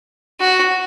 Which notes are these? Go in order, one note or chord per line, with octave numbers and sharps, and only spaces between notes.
F#4